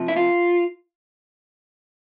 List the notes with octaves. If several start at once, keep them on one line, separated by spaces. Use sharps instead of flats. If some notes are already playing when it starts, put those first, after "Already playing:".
Already playing: C3 F3
E4
F4